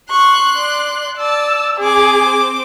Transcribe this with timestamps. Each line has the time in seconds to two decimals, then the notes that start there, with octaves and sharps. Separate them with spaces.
0.11 C6 C#6 F#6
0.55 D5
1.17 D5 A5 E6
1.80 C4 G#4 D6